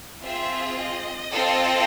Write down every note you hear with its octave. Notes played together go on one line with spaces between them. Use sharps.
C4 F4 G#4 E5
D#5
C4 F4 A4